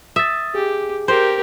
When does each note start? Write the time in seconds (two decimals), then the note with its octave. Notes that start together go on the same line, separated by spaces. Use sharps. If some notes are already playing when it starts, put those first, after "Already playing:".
0.16 E5 D#6 A6
0.55 G4 G#4
1.08 G4 A#4 C5